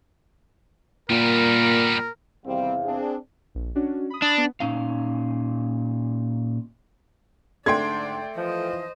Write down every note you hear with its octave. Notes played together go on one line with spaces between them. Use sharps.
A#2 G3 B3 A#4
E2 C3 D#3 G3 C4 F5
C4 D4 G#4
A#1
C#4 D4 F#4
B5 D#6
D4
B3
A#2 C#4 D#4 F5
G#2 D3 A3 D4 D5 G5 C6 G#6
E3 F3 C5 D#5